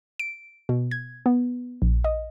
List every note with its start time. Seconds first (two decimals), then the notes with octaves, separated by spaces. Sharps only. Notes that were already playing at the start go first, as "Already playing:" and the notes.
0.20 D7
0.69 B2
0.91 G#6
1.26 B3
1.82 A#1
2.04 D#5